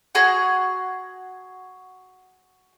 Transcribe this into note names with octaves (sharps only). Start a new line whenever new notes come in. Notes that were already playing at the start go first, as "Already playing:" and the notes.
F#4 G#4 F#5